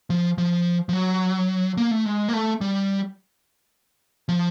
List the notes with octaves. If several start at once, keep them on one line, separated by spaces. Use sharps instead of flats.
F3
F3
F3
F#3
A#3
A3
G#3
A#3
A3
G3
F3